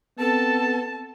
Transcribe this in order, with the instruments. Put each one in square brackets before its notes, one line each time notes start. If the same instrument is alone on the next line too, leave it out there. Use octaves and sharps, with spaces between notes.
[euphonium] B3 [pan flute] C4 [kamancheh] A4 [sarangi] A5